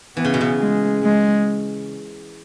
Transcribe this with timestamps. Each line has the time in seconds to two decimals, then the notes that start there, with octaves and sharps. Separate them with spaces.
0.16 E3 B3
0.25 C#3
0.34 B2
0.41 C#3
0.60 G#3
1.03 G#3